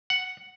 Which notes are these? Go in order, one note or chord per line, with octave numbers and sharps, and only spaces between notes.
F#5